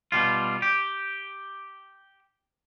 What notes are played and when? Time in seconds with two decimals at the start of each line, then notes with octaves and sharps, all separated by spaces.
0.12 B2 G3 F4
0.62 G4